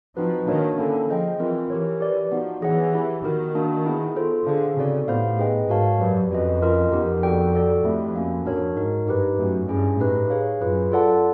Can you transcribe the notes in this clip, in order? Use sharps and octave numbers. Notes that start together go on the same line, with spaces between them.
F3 C4 D#4 F#4 B4
D#3 A#3 D4 F#4 A#4 C#5
D3 A#3 C#4 E4 A4
F3 G#4 C5 D#5 G5
E3 C4 F4 A#4
E3 G4 A#4 C#5
G4 B4 D5
F3 B3 D#4 F#4
E3 G#4 C#5 F#5
B3 E4 G4
D#3 D#4 F#4 A#4
A#3 D4 F#4
B3 E4 G#4
F4 A4 C5
D3 G#4 C5 F5
C#3 C4 D#4 F#4 A4 D5
A2 B3 E4 G4 C5 F5
D#4 G#4 B4 D#5 G5
G#2 F#4 A#4 C#5 F5 A5
F#2 G4 B4 D5
F2 C#4 F#4 B4 D#5
C#4 F4 A#4 D#5
F2 B3 D#4 G4 A#4
F#4 A4 D5 G5
F#4 A4 D5
F2 A3 C4 E4 G4
A#3 C#4 F#4
F2 D4 F#4 A#4 C#5
G#2 D#4 F#4 A#4
G2 D#4 G4 B4
F#2 A3 C#4 F#4
G2 C#4 E4 G#4
A2 D#4 G4 B4
G#4 C#5 F5
F#2 F4 G#4 B4
F4 A4 D5 F#5 A5